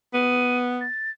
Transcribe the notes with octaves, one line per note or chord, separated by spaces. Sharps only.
B3 D#7
A6